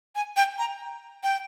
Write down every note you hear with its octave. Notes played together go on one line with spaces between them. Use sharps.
G#5
G5
A#5
G5